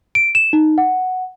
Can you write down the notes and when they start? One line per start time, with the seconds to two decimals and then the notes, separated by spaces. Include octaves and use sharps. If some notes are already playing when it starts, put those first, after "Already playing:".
0.15 D7
0.35 E7
0.53 D#4
0.78 F#5